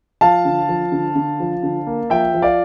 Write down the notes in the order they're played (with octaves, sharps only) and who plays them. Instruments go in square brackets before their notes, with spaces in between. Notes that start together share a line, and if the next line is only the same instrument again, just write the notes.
[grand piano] F3 F5 A5
D3
F3
D3
D3
F3
D3
A#3
F3 E5 G5
F3
D5 F5